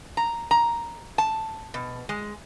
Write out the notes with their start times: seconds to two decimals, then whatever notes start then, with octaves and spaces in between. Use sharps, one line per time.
0.17 A#5
0.51 A#5
1.18 A5
1.74 B2
2.09 G#3